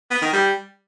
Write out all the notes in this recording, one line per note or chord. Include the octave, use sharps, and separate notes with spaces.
B3
D#3
G3